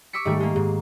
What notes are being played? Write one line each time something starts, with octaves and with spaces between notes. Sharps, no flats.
C#6 D6 E6 B6 C#7
G#2 D#3 G3 A3
G#3 A#3
G#2